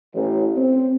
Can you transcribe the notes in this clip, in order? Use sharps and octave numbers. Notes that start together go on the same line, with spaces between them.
A1
C4